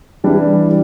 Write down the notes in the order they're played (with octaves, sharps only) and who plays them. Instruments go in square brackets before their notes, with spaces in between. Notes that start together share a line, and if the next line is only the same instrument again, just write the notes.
[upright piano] E3 G3 D4